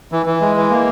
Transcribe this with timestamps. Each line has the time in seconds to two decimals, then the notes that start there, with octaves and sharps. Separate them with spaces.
0.12 E3
0.26 E3
0.41 G#3
0.56 E3
0.70 A#3